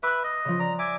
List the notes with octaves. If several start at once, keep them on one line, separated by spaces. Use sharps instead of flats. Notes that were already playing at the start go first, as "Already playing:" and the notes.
B4 E5 D6 F#6
D#5
C#3 F3
D5 A#5
E5 G#5 D6